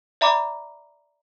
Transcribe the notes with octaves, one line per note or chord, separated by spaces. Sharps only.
D5 E5 A#5 B5 D6